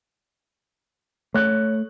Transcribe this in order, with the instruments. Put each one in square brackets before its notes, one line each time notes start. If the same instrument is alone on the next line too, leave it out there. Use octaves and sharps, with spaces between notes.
[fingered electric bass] A3 [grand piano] C#5 F#6